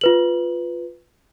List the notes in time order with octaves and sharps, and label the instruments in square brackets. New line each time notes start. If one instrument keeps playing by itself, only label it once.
[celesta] F4 B4 F#7